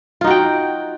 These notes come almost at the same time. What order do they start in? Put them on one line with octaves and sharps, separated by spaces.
F4 D#4 F#4 G5